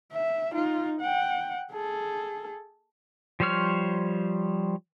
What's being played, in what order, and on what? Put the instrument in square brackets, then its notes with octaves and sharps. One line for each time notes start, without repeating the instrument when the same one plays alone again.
[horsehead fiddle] E5
D#4 F4
F#5 G5
G#4 A4
[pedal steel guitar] F3 G3 C5 C#5 F6